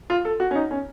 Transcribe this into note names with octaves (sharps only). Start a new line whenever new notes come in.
F4
A4
F#4
C#4
D#4
C#4